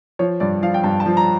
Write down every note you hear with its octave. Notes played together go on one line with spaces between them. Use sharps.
F3 C#5
G2 D5
F3 F5
G5
G2 A5
A5
F3
A#5